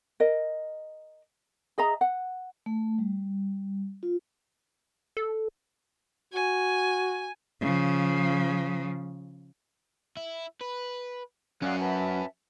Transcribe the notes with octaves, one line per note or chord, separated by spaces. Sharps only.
A#4 D#5
G#4 D#5 E5 A#5
F#5
A3
G3
F4
A4
F#4 G#5
C#3 F3
E4
B4
F#2 C#4 F#4 D5 F5 F#6
B4 E5 A5